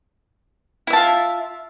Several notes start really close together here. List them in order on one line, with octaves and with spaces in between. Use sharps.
E4 E5 A5 F4